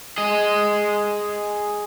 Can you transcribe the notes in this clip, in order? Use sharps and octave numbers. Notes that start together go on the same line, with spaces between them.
G#4 D#5